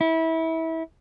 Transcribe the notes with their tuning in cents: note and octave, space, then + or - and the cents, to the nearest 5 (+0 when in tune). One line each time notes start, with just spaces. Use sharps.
E4 -25